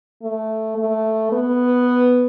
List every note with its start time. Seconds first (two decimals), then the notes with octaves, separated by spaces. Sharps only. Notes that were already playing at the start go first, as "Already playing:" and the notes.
0.23 A3
0.78 A3
1.32 B3